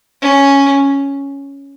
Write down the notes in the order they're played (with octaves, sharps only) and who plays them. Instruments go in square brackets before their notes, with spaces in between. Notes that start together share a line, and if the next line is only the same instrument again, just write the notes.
[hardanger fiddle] C#4